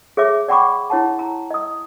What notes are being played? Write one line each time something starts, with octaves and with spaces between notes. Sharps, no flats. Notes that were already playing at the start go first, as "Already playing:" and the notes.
G#4 C#5 E5 D6
D5 F#5 G5 B5 C#6 D6
E4 C#5 F#5 A5
A#5
D#5 D#6